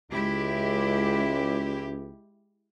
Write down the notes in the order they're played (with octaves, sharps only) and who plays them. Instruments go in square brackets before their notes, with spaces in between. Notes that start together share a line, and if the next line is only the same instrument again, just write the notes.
[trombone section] C#2 [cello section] G#3 E4 G4